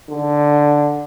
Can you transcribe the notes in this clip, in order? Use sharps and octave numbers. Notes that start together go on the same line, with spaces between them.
D3